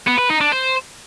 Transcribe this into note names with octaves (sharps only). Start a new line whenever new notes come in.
B3
B4
D#4
D4
C5